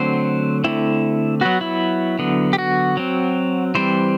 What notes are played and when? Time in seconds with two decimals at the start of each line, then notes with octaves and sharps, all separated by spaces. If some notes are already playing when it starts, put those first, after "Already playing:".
Already playing: D3 F#3 A3 C4 C5
0.64 D3 A3 C4 E4
1.41 F#3 B3 F#4
1.61 E4
2.19 D3 F#3 B3
2.53 G4
2.58 F#4
2.97 F#3 C4
3.75 E3 G3 C4 C5